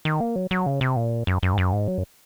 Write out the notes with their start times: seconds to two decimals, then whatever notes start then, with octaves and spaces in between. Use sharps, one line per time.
0.05 D#3
0.20 A#3
0.36 F#3
0.51 F#3
0.66 C#3
0.81 C3
0.96 A#2
1.27 F#2
1.43 F#2
1.53 G#2
1.58 F#2
1.73 G#2
1.88 F#3
1.98 F#2